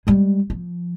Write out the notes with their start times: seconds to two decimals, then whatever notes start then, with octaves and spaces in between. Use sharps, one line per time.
0.07 G3 G#3
0.50 F3